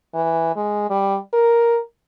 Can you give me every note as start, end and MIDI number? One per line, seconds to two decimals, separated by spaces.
0.15 0.53 52
0.56 0.86 56
0.90 1.18 55
1.33 1.79 70